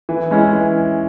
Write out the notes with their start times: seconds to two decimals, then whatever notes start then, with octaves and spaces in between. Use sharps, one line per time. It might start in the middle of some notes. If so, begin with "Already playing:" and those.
0.09 E3
0.31 G#3 C#4 E4
0.53 E3